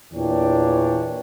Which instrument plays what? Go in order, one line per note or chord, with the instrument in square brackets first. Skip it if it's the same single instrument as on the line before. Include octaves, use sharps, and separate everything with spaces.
[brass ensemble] E2 A#2 E3 D4 C#5 G5